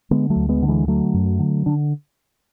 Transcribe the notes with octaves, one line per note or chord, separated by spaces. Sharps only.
D3 G#3 B3
F#3 A3
D2
G#3 B3
D3
E3 G#3
D3 F#3 A3
F#2
D3
D3 D4